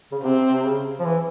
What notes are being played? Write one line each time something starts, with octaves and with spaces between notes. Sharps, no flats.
C#3
C3 C4
C3
C#3
F3
E3